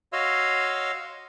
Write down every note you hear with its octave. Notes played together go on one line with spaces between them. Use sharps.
F#4 C#5 D#5 F5 C6 E6